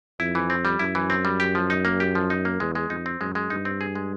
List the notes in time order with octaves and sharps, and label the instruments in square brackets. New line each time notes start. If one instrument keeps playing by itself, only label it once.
[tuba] F2 [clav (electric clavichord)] E4
[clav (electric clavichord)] E3
C4
G3
[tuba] F#2 [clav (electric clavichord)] E4
[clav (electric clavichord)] E3
C4
G3
G4
F3
D#4
A#3
G4
F3
D#4
A#3
[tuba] E2 [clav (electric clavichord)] G#3
[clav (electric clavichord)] G#3
[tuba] F2 [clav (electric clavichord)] D#4
[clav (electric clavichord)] C4
[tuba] F#2 [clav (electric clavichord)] G#3
[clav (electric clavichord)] G#3
[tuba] G2 [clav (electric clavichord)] D#4
[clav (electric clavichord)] C4
G#4
G#3